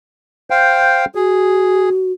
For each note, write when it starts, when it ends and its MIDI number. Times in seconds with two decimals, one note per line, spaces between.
0.50 1.05 72
0.50 1.05 77
0.50 1.05 79
1.15 2.12 66
1.15 1.89 68